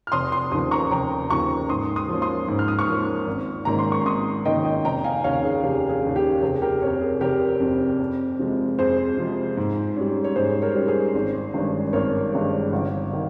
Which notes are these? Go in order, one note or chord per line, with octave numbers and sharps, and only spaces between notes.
F6
F1 C6 D#6
C6 D#6
D#2 C#3 F3 C6 D#6
A#5 C#6
F1 G5 A#5
D#2 C#3 F3 A#5 C#6
G#2 C6 D#6
C6 D#6
F3 A#3 C#4
C6 D#6
G#2
F6
D#6
C#6 F6
F3 A#3 C#4
G#1
G#2 D#3 A#3 C#4 A#5
C6
C#6
G#1 C6 D#6
G#2 D#3 A#3 C#4 D#5 G5
D#5 G5
F1 G5 A#5
F5 G#5
D#2 C#3 C#5 F5
G#4
F1 G4
G#4
D#2 C#3
G4
F1 G#4
G4 A#4
F2 C3 A#4 C#5
G#4
F1 G4 A#4
F2 C3
F2
C3 F3 G#3
F2 G#4 C5
C3 F3 G#3
G#2
G3 C#4
C#5
G#2 G#4 C5
A#4 C#5
G3 C#4
G#4 C5
G#1
G2 D#3 G#3 C#4
G#1 A#4 C#5
G2 D#3 G#3 C#4
G1
D#3